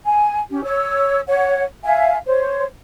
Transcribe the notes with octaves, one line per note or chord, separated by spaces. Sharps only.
G#5
C#4 G4
C#5 E6
C#5 F#5
E5 F5 G#5
C5 C#5